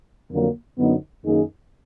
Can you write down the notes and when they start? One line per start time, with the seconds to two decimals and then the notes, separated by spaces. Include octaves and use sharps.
0.30 F2 D3 F#3 A#3
0.78 F#2 D3 F#3 B3 D#4
1.24 F#2 D#3 A#3 D#4 G#4